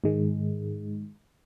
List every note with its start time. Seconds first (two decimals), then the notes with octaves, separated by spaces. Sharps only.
0.04 G#2 D#3 G#3